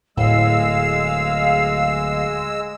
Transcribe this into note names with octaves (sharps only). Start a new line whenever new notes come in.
D1 A2 G#3 F5 E6